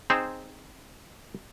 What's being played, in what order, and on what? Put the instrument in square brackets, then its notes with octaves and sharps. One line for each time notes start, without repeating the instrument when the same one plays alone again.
[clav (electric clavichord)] C4 D#4 G#4 C5